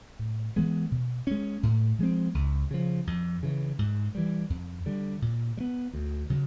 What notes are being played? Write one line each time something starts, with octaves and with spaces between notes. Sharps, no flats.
A2
E3 G#3 B3
B2
G#3 C#4
A2
F3 G#3 C4
C#2
C#3 F3
F2
C#3 E3
G#2
E3 G3
F2
D3 G3
A#2
G3
B3
D2
C#3 F#3